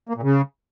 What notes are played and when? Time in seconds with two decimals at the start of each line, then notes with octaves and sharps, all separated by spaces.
0.09 A#3
0.16 A#2
0.23 C#3